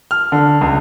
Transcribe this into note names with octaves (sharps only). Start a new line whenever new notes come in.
F6
D3
C#2